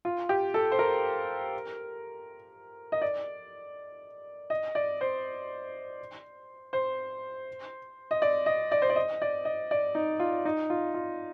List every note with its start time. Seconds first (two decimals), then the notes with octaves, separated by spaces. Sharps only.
0.05 F4
0.29 G4
0.54 A4
0.72 C5
0.79 A#4
2.92 D#5
3.02 D5
4.50 D#5
4.75 D5
5.01 C5
6.73 C5
8.11 D#5
8.22 D5
8.46 D#5
8.72 D5
8.82 C5
8.90 D5
8.96 D#5
9.22 D5
9.45 D#5
9.71 D5
9.95 D#4
10.20 F4
10.45 D#4
10.70 F4
10.94 F4